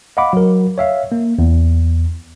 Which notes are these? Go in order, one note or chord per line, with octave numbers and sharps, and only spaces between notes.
D#5 F5 F#5 B5 D6
F#3 A#4
C#5 E5 F5
A#3
E2